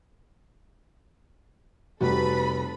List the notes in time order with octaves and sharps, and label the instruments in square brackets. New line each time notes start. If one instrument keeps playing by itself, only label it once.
[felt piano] F1 G3 F#4 [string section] A4 B4 B5